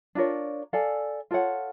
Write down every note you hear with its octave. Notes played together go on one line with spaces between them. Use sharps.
D4 F4 A#4 C#5
A4 D5 F5 G#5
F4 A4 C#5 F#5